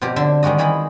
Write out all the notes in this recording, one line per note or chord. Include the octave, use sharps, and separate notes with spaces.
B2 F3 C4 G4
D3 E5 C6
D#3 G3 G#3 F#4 D#5
D#3 E3 G#4 D#5 B5